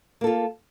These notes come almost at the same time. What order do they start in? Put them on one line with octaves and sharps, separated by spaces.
A#3 A4 F4